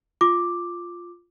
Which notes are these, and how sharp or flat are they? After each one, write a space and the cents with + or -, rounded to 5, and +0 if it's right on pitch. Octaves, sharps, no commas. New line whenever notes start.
F4 +0 D6 +0